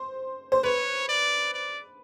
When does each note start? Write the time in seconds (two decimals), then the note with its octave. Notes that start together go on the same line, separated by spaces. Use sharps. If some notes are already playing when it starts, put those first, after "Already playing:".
Already playing: C5
0.52 C5
0.63 B4 C#5
1.09 D5
1.54 D5